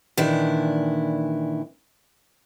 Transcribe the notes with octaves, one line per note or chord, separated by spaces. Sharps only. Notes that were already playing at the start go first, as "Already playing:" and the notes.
A#2 D#3 E3 D4 E4